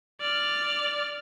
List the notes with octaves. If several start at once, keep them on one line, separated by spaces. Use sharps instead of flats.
D5 F6